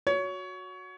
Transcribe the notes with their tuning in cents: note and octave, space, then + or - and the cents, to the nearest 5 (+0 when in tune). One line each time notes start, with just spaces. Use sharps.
F#4 -15 C#5 +20